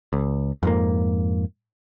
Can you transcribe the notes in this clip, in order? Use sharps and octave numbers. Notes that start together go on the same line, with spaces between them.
C#2
F2 G#2 A#3